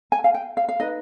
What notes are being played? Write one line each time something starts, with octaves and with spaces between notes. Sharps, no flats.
G#5
F5
G5
F5
F5
D#4 B4 D#5